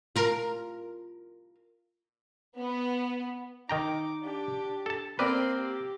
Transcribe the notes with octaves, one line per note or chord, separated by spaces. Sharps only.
F4 A#4
B3
D#3 D#4 G5 A#5 D6
D4 G4
A4 A5
A#3 C4 B4 D5 G5 C6
G4